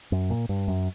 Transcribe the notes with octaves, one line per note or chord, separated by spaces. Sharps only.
F#2
A#2
G2
F#2